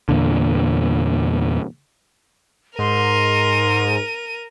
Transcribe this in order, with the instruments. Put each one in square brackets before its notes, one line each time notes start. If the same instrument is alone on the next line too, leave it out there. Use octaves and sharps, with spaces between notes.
[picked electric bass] E2 A#2 D3
[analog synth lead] G#2 [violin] A#4 D#7 [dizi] C6